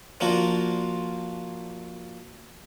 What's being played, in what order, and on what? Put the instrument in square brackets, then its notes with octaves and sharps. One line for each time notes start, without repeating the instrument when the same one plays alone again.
[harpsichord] F3 A#3 D4 F4 F#4